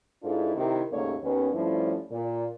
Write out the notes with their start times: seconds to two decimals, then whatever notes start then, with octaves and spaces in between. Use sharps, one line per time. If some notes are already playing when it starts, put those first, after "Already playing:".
0.23 G#2 D4 E4 F4 A4 A#4
0.56 C3 D#3 E4 G4 A#4
0.92 D#2 G#2 C#3 A3 A#3 C#5
1.23 D#2 B3 C#4
1.52 G2 F3 A3 C#4 D4 E4
2.11 A#2